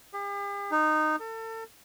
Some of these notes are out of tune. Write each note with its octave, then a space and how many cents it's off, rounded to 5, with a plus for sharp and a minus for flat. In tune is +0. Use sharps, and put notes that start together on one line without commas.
G4 +45
D#4 -15
A4 +35